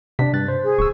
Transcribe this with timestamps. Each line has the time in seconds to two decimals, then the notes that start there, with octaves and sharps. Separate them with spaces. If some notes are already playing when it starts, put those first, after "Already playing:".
0.19 C3 D4 B6
0.33 G2 F#6 A6
0.48 C5
0.62 G#4
0.79 D1 C#6 E6